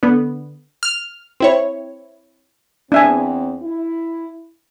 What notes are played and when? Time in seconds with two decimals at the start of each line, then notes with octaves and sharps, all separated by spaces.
0.03 D3 B3
0.83 F6
1.40 C4 E4 C#5
2.92 E2 C4 D4 E5 G#5
3.62 E4